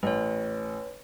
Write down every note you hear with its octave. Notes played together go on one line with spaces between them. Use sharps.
A1 B4 C#5